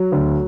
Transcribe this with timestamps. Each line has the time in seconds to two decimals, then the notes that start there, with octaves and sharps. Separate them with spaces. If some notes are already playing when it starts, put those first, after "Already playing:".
Already playing: F#3
0.12 D2